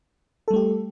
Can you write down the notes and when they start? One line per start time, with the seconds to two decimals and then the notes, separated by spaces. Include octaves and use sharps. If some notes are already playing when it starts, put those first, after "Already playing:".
0.48 A4
0.50 G3
0.53 A3
0.56 G4